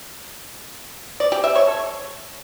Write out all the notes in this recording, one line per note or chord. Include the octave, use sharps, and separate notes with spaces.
D5
G4
E5
C#5
A4